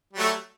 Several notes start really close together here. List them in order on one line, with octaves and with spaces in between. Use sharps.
G3 F#3 A3